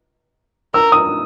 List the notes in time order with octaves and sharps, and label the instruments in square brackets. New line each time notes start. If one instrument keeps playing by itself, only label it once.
[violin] A#4 [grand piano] E6
[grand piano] D#6